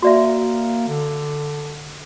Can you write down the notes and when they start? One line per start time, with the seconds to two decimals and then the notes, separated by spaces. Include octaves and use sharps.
0.02 A#3 F#4 D5 E5
0.88 D3